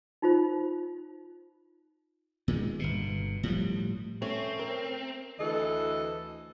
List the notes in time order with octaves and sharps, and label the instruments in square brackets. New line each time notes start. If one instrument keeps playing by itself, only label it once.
[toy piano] D#4 F4 C5
[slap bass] A#2 D#3 G#3
G1 B2
A2 F3 G3
[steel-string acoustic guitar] A3 C#4 [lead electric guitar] C4
[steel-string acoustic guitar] A#4
[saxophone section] D2 E3 A4 D#5